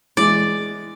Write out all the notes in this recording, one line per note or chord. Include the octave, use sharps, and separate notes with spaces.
E3 G#3 D5